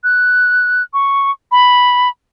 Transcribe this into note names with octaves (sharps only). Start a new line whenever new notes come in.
F#6
C#6
B5